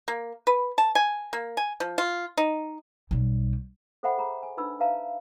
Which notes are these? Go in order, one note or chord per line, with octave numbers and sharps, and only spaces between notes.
A#3
B4
A5
G#5
A#3
G#5
F3
F4
D#4
B1 G3
A4 C5 E5 F#5 G5 B5
G#4 C#5 A#5 B5
G#5
D4 D#4 B4 B5 E6
B4 C#5 E5 F5 A5 A#5